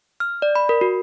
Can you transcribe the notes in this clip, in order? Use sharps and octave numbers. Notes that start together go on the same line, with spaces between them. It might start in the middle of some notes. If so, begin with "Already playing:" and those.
F6
D5
B5
A#4
F#4